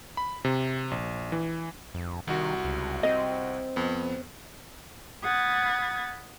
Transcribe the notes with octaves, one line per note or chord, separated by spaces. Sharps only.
B5
C3
A#1
E3
F2
C2 D#3 F#4
C#2
C4 D#5
F2 B3
F#5 B5 D#6 G#6 A6